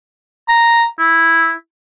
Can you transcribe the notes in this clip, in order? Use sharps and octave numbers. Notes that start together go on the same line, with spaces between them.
A#5
E4